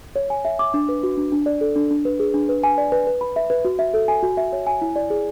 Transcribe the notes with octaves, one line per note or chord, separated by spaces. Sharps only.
C#5
G#5
E5
D6
D4
B4
F#4
D4
D4
D5
A4
D4
D4
B4
G#4
D4
B4
G#5
D5
B4
B4
B5
E5
B4
F#4
E5
A4
G#5
F#4
E5
C#5
G#5
E4
D5
G#4